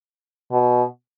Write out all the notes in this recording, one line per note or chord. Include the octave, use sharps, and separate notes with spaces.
B2